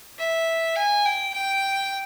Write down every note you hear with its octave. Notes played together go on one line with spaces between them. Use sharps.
E5
G#5
G5
G5